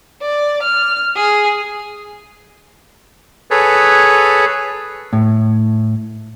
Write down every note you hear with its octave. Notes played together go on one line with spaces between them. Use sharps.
D5
F6
G#4
G#4 A4 B4 C#5
A2